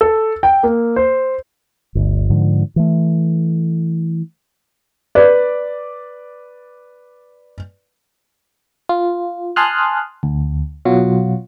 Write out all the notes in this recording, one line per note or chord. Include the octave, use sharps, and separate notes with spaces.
A4
G5
A#3
C5
G1 D2
G#2 D3 F3
E3 A3
B4 D5
F4
G#5 A5 C6 D#6 F6 F#6
D2
B2 F#3 F4 F#4